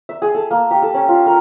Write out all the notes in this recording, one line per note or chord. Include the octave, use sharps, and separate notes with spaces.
E5
G#4
A4
A#3
G4
A4
C#4
F4
A#4